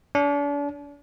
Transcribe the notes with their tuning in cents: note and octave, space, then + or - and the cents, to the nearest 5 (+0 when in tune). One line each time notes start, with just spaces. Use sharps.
D4 -40